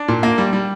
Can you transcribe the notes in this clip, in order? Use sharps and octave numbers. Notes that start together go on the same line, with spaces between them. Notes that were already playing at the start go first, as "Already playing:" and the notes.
Already playing: D4
A#2
A#3
G3
G3